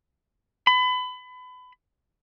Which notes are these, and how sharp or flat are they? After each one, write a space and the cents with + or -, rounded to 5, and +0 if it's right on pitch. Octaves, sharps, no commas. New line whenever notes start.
B5 +30